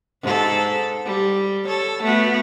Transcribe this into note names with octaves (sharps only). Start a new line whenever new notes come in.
G#2 D#4 A4
G3
A4 C#5
A3 B3 F#4